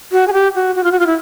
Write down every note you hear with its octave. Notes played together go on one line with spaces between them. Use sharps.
F#4
G#4
G4
F#4
F#4
F4
F#4
F4
E4